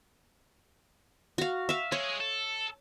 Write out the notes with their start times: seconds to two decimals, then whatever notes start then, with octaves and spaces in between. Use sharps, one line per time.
1.38 F#4 F5
1.69 E5 F5
1.92 G#3 G#4 C#5
2.20 A4